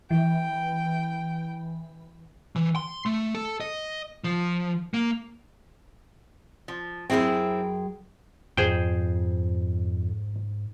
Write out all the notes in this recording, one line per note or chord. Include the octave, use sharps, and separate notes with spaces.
E3 G5
E3
C6
A3
A4
D#5
F3
A#3
F3
F#2 C4 E4 G#4 G5
F2 G#2 G#4 C5 G5